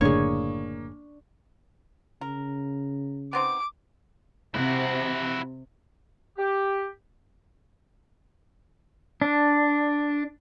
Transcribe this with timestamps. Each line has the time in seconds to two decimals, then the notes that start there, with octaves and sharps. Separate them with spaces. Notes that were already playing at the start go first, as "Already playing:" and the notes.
0.01 F#1 A2 D3 A#3 D4 G#4 C#5 C#6
2.21 C#3 A#4
3.33 B3 C4 D#4 D6
4.55 C3 E4 F#4
6.38 G4
9.22 D4